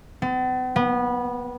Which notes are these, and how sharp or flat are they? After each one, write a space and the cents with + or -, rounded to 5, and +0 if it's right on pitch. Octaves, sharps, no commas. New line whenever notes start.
B3 +45
B3 -20